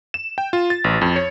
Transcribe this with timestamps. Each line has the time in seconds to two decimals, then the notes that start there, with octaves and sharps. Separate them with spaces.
0.14 E7
0.38 G5
0.53 F4
0.70 A6
0.84 A1
1.01 F2
1.16 C#5